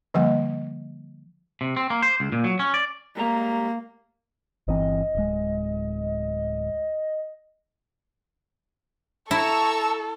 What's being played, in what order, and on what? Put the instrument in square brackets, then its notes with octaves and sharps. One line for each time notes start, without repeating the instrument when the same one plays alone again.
[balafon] D3 F3 G3 A#3 D#5 F#5
[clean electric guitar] C3
C4
A#3
C5
C#2
A#2
F#3
C#4
D5
[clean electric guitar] G#2 G3 A#5 [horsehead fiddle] A#3
[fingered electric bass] G1 E3 C4 [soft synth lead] D#5
[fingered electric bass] D1 G#3
[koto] E4 [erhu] A4 [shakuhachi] A5 [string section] A#5 C#6 E6